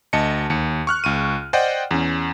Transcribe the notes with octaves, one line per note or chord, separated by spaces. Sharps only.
D2 D#5 A5 C#7
D#2 C#7
C#6 F6 F#6
C#2 C#6 D#7
C5 D5 D#5 F#5 G5
E2 C#4